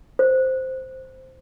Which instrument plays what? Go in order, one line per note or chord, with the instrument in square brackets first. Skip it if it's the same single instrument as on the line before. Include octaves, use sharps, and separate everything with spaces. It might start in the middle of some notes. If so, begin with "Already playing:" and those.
[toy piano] C5